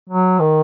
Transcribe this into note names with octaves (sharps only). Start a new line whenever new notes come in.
F#3
D#3